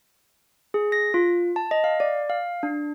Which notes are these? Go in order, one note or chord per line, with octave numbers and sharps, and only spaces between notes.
G#4
A#6
F4
A5
D#5
F5
D5
F5
D4